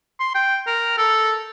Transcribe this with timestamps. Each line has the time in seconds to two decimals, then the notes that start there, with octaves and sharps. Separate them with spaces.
0.20 C6
0.35 G5
0.67 A#4
0.98 A4